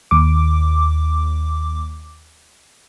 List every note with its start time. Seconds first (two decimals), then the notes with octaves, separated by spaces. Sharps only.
0.11 D#2 D6